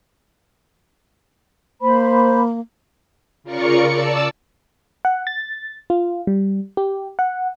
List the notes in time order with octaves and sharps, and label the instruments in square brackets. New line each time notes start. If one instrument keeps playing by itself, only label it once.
[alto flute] A#3 [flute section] C5 B5
[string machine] C#3 F4 A#4 D5 C#6 C#7
D5 A5 E6
[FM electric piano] F#5
A6
F4
G3
G4
F#5